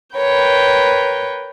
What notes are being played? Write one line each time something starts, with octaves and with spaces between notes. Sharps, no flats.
A#4 B4 C#5 G5